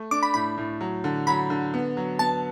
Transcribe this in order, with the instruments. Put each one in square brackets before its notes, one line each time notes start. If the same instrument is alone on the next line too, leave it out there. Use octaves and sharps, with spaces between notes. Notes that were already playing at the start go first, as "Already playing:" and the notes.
Already playing: [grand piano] A3
[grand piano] D4 [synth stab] D6
[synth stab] B5
[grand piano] A2 [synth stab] B5
[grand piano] A2
F#3
D3
[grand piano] F#3 [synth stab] B5
[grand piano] D3
B3
F#3
[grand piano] B3 [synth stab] A5